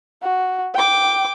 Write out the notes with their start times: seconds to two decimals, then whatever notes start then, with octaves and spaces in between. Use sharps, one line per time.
0.22 F#4
0.74 G5 D6